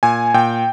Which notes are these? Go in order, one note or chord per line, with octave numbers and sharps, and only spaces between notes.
A#2 G#5
A#2 G5